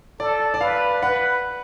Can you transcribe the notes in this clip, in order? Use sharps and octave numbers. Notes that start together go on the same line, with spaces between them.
A4 D5
D5
B4 F5
B4 F#5